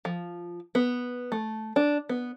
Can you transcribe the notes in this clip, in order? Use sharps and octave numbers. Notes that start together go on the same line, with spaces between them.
F3
B3
A3
D4
B3